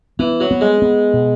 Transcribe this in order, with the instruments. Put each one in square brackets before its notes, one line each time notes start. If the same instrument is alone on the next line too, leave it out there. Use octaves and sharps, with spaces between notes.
[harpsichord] E3 [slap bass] B3
[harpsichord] F#3
[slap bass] B3
[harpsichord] G#3
[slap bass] B3
B2